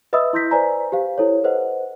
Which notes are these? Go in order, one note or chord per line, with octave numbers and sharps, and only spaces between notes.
B4 D#5 E5 B5 D#6 E6
E4 C6 E6 G6 A#6 B6
B4 C5 D5 G#5 A#5
G4 C5 F5
E4 A4 C5 C#5
A4 B4 C5 D#5 F#5